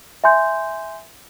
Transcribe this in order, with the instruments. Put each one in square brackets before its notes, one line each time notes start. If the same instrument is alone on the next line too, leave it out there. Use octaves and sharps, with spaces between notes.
[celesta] E5 G#5 C6 G6